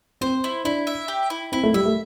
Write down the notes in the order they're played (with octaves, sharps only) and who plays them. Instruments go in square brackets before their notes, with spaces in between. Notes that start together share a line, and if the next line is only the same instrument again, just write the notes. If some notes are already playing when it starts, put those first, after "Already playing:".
[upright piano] C4 [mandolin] C5
[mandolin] E4
[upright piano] D4 [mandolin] E4
[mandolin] E5
G4
E4
[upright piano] C4 [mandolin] E4
[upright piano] A3
[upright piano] G3 [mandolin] E5
[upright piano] A3